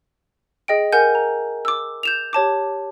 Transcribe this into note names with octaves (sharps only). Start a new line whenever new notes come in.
G#4 D#5 G5 D7
A#4 F#5 G#5 G6
A#5
D6 E6
G6 E7 F7
G4 C#5 A5 D6